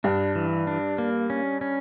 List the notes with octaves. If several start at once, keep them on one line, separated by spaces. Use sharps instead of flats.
G2 D4
E3
D4
A#3
C#4
C#4